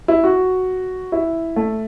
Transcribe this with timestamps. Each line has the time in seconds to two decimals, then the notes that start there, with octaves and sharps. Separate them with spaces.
0.08 E4
0.24 F#4
1.12 E4
1.56 A3